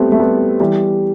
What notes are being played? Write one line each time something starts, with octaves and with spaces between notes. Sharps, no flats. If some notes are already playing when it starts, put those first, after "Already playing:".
Already playing: G3 A3 B3 C4
A3
G3 B3
E3 G3